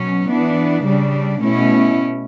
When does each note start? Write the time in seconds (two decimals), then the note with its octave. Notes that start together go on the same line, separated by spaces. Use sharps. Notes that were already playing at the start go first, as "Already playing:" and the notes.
Already playing: B2 F#3 C#4
0.30 E3 B3 D4
0.86 C#3 G3 D4
1.42 B2 A3 C#4 E4